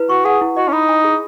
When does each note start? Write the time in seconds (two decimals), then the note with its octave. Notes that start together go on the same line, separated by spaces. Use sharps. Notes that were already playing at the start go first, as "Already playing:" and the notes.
Already playing: E4 B4
0.09 F#4 C#6
0.25 G#4 F#5
0.41 E4
0.57 F#4 D#5
0.68 C#4
0.73 D#4 B5
0.89 G#5
1.04 G#4